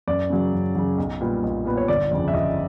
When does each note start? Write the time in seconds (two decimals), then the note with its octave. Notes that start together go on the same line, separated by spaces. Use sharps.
0.07 F#2 D5
0.30 C#3 F#3
0.53 F#2
0.75 C#3 F#3
0.98 B1
1.21 A#2 G3 B3
1.43 B1
1.65 A#2 G3 B3
1.77 C#5
1.88 G1 D5
2.11 F2 C#3
2.28 E5
2.34 G1 D#5